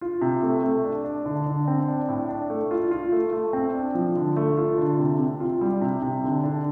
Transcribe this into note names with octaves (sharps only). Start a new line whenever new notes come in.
F4
C3
A3
A3
D4
D4
D3
D3
C4
D4
A2
D4
A3
F4
F4
A3
A3
C4
D4
F3
D3
A3
F4
D3
C3
C3
F4
G3
C3
C3
D3
D3